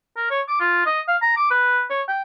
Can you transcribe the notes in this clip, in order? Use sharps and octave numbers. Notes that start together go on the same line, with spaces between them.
A#4
C#5
D6
F4
D#5
F5
A#5
D6
B4
C#5
G5